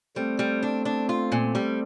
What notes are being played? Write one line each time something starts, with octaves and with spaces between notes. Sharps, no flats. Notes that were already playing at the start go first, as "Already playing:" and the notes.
G3 A3 C4
G3
D4
D4
F4
A#2
G3